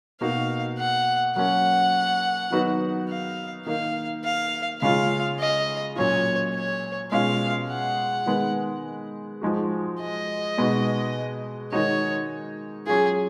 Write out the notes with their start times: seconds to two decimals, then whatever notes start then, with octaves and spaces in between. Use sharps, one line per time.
0.21 B2 A#3 D#4 F#4 F5
0.78 F#5
1.36 F#3 A#3 C#4 F#5
2.51 D#3 F#3 B3 D#4 F#4
3.09 F5
3.66 D#3 A#3 D#4 F5
4.24 F5
4.82 C#3 G#3 C#4 F4 F5
5.39 D#5
5.96 A#2 F#3 C#4 F4 C#5
6.54 C#5
7.11 B2 G#3 C#4 F4 F5
7.70 F#5
8.26 D#3 G#3 B3
9.42 F3 G#3 D#4 F#4
10.00 D#5
10.58 B2 G#3 B3 D#4 F#4
11.72 D#3 G#3 D#4 F#4 C#5
12.87 F#3 C#4 F4 G#4